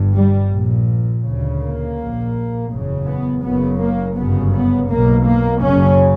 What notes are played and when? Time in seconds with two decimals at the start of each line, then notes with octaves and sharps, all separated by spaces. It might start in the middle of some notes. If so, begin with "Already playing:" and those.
Already playing: G1 G2
0.13 G3
0.51 A#1 A#2
1.23 D2 C#3
1.60 A#3
1.97 A#1 A#2
2.70 F#1 E2 C#3
3.07 B3
3.43 F#1 F#2 C#3 B3
3.79 A#3
4.16 G1 F#2 C#3 B3
4.52 B3
4.90 B1 B2 A#3
5.26 A#3
5.62 F#1 F#2 C#3 C#4